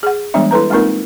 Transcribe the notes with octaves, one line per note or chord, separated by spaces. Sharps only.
G#4 F#5
E3 G3 G#3 B3 D4 E5
E4 A4 B4 A#5
G#3 A#3 C4 D#4 F4 A#4